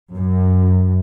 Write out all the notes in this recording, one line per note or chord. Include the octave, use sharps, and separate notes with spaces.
F#2